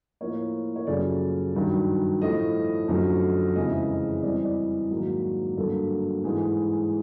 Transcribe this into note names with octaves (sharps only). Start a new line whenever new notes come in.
A2 F3 A#3 C#5
C#5
F#2 C#3 F3 A3 D5
G2 D#3 F#3
A2 F3 A3 D#5
F#2 D3 F3 A3
F2 C#3 E3 G#3 D#5
E5
D#5
C3 E3 G3 D5
D#5
D5
G#2 D#3 F#3 A#3
G2 D3 F#3 A#3 A4
G#2 E3 G#3